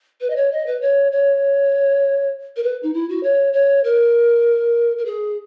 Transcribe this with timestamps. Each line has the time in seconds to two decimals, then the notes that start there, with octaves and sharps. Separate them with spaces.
0.21 B4
0.30 D#5
0.36 C#5
0.52 D#5
0.66 B4
0.81 C#5
1.12 C#5
2.56 A#4
2.63 B4
2.83 D#4
2.94 E4
3.09 F#4
3.23 C#5
3.53 C#5
3.84 A#4
4.98 A#4
5.05 G#4